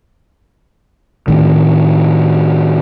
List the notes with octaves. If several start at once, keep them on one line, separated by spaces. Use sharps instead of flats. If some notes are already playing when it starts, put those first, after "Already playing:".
A2 D#3